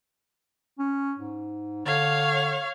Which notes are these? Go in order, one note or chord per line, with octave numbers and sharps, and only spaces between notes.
C#4
G#2
D3 C#5 F5